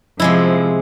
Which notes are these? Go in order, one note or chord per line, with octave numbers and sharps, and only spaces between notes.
C3 F3 G#3 E4